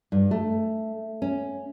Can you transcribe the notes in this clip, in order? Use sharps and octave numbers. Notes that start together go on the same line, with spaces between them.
G2
A3
C#4